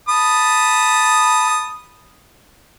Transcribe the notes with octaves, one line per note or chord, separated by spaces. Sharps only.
A5 B5 D#6